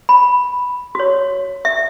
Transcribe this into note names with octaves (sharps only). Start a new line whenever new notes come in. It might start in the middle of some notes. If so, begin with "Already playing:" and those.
B5
F#4 C#5
E5